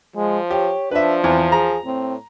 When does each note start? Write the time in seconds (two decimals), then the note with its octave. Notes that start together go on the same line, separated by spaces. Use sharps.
0.16 F3 G#3
0.50 G4 C#5
0.91 F3 D4 B4 E5
1.24 E2 C4
1.52 G#4 A#5
1.85 A2 C4